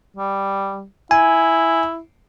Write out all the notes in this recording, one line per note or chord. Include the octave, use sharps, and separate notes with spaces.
G3
E4 G#5